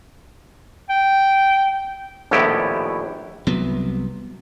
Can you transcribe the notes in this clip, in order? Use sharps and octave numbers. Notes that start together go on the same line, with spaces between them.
G5
A#1 D#2 A2 B3 E4 G4
C2 F#3 B3